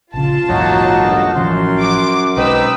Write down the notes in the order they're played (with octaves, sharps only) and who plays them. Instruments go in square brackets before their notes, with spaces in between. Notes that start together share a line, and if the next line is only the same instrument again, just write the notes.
[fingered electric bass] A#1 C#3 [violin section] F4 A5
[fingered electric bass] A#1 E2 G#2 [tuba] F#3 [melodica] A#3 D#4 F#4
[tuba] G1
[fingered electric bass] A1 E3 F3 [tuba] F#2 [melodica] C6
[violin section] D6
[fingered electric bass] B1 G#3 [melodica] C4 D#4 [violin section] B4 E6